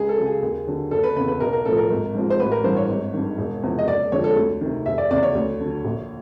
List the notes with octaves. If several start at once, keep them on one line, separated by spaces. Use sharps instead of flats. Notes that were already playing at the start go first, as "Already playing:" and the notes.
Already playing: C#2 G#4
A4
C#3 F#3
G#4
D#2
D3 F#3
F#1 A4
B4
E2 C#3 B4
B4
B1 A#4
A#4
A2 F3 A4
A#4
G#1
G#2 F3 G#3
C5
A1 B4
A#4
G2 E3 G3 C5
C#5
G#1
G2 D#3
E1
E2 C3 F3
D#5
F#1 D5
F2 D3 F3 G#3 C#5
A4
D2
C3 D#3
F1 E5
D5
E2 C#3 D5
C#5
D2
D3 F#3
A#1